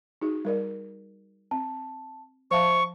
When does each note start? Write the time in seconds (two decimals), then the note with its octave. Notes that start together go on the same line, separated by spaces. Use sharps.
0.22 D#4 F#4 G#4
0.45 G3 A#4 D5
1.51 C4 A5
2.51 F3 C5 E5 F5 A5 C#6